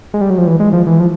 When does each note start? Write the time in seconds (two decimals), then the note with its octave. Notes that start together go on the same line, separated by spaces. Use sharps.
0.14 G#3
0.21 G3
0.30 F#3
0.38 F3
0.47 E3
0.60 G#3
0.73 F3
0.87 E3
1.00 F3